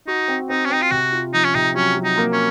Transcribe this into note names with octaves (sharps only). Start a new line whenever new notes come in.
D#4 F#4
C4
C4 D#4
C#4
C4 D#4
F4
C3 F#4
F4
F3 D#4
C#4
C3 D#4
F#3 C#4
F#3
D#4
A#3
C#4